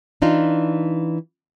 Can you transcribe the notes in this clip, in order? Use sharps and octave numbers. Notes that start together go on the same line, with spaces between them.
E3 D4 D#4 F4